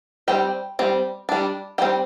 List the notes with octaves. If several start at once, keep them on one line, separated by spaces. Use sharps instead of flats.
G3 C4 G5
G3 C4
G3 D4
G3 C4 G5